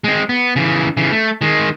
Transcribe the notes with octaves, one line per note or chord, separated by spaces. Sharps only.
G#3 C4
B3
C#3 E3
C#3 E3
A3
D#3 G#3